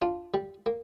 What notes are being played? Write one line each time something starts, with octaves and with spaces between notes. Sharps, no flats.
D4 F4
G3
A#3